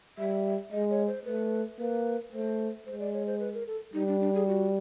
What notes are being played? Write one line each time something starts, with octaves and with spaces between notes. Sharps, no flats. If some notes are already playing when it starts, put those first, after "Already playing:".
G3 E5
G#3 D#5
C#5
C5
A3 B4
A#3 B4
A3 C5
G#3 C5
D5
C#5
C5
B4
A#4
A4
G3 D#4
D4
D4
G#4
F#4